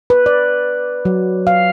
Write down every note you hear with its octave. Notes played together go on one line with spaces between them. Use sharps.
B4
D5
F#3
F5